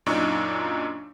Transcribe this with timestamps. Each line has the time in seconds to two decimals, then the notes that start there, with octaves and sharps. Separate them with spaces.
0.06 F#2 A#2 D4 D#4 C#6